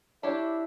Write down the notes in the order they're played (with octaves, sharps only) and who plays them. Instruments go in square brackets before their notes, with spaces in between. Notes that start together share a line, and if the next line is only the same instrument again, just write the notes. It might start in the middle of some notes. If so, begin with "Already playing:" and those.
[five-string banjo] D4 G4 C#5 [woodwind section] E4